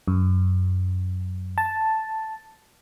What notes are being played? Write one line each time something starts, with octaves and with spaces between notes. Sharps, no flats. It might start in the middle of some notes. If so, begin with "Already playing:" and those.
F#2
A5